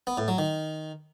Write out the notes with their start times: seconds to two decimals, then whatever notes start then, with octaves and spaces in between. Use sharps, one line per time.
0.07 B3
0.18 A2
0.28 F#3
0.38 D#3